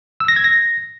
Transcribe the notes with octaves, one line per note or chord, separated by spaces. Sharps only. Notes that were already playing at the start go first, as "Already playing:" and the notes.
E6
A#6
G#6
A#6